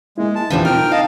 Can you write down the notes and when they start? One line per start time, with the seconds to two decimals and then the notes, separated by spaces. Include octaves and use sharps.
0.18 G#3 A#3 E4
0.35 A5
0.50 E2 A#2 E3 F3 G3 D4
0.65 B2 C4 F4 A#4 G5 F6
0.77 D#4
0.92 D#5 F5 A5